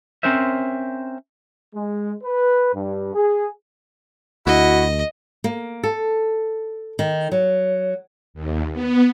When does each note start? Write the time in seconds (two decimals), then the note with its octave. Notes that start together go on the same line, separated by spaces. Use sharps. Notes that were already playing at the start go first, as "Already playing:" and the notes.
0.23 C4 C#4 A#4 C5 E5
1.74 G#3
2.24 B4
2.74 G2
3.15 G#4
4.47 D2 E4 F#4 D#5
5.44 A#3
5.84 A4
6.99 D#3
7.32 F#3
8.34 D#2
8.73 B3